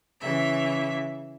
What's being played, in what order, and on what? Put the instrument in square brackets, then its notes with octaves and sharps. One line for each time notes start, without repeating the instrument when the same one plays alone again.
[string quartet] C#3 E3 E5